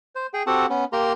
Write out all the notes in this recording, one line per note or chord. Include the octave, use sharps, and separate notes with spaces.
C5
G#4 G5
C4 F#4 G4 A4 F#5 A5
B3 C#4
A#3 G4 A#4 A#5 C6